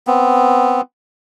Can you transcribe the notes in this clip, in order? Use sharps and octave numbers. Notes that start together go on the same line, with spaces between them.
B3 C4